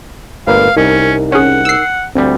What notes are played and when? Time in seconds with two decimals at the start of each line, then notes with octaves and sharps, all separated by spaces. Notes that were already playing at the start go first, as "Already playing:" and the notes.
0.47 G1 A#2 A3 A#4 B4 F5
0.77 C2 C#4 D#4 A#4
1.32 C#4 G#4 F#5
1.65 E6 C7
2.16 D2 G3 C4